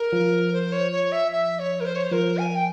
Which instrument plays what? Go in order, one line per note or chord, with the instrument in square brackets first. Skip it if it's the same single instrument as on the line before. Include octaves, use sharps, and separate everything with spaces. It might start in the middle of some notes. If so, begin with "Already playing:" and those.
Already playing: [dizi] A#4
[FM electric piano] F3
[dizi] C5
C#5
C#5
E5
E5
C#5
A#4
C5
C#5
C5
[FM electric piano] F3 [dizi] A#4
[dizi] G#5
G5